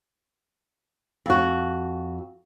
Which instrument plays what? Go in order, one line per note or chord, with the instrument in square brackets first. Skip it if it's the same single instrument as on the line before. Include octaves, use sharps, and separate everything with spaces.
[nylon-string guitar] F2 F#4